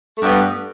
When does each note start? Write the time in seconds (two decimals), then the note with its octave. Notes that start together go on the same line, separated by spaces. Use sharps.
0.17 A3
0.21 G2
0.25 B3